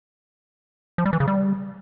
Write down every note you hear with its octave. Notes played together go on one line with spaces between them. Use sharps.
F3
G3
E3
C#3
G3